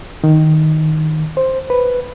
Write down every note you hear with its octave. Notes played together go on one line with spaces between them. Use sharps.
D#3
C5
B4